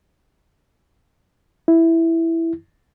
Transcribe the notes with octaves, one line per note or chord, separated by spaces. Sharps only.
E4